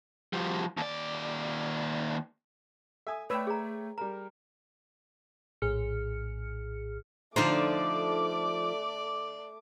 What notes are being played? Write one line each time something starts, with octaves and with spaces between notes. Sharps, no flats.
F3 G3
D#2 D5
A4 E5 G#5 D#6
A3 B4 C#5 D5 G5 E6
G#4 A#5
G3 A#4 A#5
A#1 A2 G#4 F6 C#7
D3 F3 A3 D4 D#4 C5 D5 D6